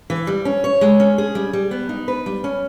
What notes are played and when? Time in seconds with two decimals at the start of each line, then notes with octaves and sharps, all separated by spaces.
0.10 E3
0.27 G3
0.45 C#4
0.64 C#5
0.81 G#3
1.00 C#4
1.18 G#4
1.35 G3
1.53 G3
1.71 B3
1.89 D#4
2.08 B4
2.26 G3
2.44 C#4